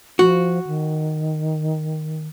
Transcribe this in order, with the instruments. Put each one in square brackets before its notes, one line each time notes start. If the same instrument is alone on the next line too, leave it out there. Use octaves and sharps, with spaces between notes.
[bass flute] F3 [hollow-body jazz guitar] F#4
[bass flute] D#3